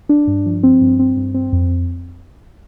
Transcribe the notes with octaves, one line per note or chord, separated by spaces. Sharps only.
D4
G2
F3
C4
G2
C4
G2
C4
F2